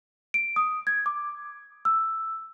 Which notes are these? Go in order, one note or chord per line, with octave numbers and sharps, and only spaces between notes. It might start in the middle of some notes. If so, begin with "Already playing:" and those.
D7
D#6
G#6
D6
E6